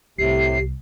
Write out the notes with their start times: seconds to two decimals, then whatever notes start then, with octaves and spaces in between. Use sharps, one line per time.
0.18 C2 A2 C3 G4 C7